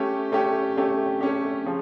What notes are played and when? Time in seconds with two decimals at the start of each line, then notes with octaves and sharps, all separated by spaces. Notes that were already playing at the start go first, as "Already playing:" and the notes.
Already playing: A3 C#4 G4
0.32 A3 C#4 G4
0.77 A3 C#4 G4
1.21 A3 C#4 G4
1.66 C#3 F3